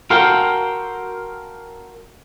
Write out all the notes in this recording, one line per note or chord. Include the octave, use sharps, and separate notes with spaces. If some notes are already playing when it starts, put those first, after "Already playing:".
F#4 A4 A#4 C5 F5 G5